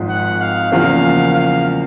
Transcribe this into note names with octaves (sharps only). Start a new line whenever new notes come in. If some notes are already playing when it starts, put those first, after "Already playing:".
Already playing: G#1 G#2 F3
F#5
F5
E2 C#3 F3 A#3 F5
F5